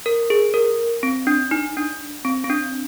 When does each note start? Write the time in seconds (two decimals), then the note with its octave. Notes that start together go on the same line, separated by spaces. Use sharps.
0.06 A#4
0.30 G#4
0.54 A#4
1.03 C4
1.27 D4
1.51 D#4
1.77 D4
2.25 C4
2.44 C4
2.50 D4